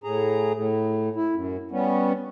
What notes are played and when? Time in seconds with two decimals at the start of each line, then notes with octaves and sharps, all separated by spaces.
0.04 A2 G#4 A#5
0.54 A2
1.16 E4
1.35 F#2
1.71 G3 B3 C#4